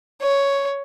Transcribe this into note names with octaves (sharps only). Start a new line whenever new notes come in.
C#5